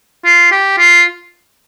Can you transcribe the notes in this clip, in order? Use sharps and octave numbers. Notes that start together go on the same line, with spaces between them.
F4
G4
F4